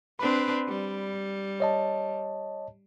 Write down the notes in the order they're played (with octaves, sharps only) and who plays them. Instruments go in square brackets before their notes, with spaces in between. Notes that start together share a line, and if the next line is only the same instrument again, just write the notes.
[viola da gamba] C4 D4 B4 [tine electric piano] B5
[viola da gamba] G3
[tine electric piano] C#5 D#5 A5